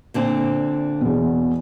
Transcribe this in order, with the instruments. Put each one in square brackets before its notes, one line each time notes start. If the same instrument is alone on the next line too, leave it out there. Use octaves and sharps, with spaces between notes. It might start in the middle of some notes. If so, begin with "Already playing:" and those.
[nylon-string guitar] A#2 D3 C4
[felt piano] E2 B2